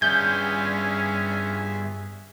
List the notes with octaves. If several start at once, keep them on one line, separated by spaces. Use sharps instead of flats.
G2 B3 C#4 G#4 E5 G#5 G6